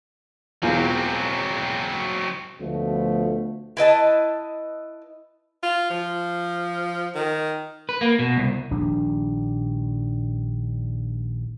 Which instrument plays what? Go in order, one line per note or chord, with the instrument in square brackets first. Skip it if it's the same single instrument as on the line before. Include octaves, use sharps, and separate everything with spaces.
[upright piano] E1 E2 F4 [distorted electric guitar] F#3 C4
[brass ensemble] D2 B2 F3 A3
[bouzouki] E4 B4 D#5 A5
[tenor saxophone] F4
F3
D#3
[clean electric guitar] B4
A#3
B2
C2
[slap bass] A#1 D#3 G3 D4